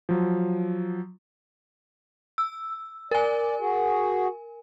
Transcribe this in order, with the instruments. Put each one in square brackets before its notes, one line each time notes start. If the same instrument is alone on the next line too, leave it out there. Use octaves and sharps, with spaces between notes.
[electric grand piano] F3 F#3
[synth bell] E6
[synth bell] A#4 G#5 [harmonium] D5
[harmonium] F#4 G#4